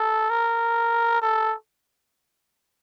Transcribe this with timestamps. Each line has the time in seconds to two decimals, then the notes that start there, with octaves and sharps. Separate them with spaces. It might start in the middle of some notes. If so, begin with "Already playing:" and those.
Already playing: A4
0.30 A#4
1.22 A4